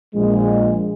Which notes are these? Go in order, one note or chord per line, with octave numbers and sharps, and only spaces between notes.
A#1 G#3